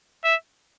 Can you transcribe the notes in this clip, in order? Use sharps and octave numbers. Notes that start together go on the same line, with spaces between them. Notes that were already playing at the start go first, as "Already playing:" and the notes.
E5